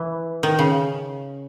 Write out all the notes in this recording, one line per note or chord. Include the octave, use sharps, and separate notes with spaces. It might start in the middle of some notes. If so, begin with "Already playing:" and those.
Already playing: E3
D#3
C#3